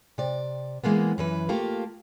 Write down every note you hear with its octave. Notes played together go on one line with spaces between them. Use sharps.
C3 D5
E3 G#3 A#3 B3
F#2 E3 B4
A3 A#3 F4 G4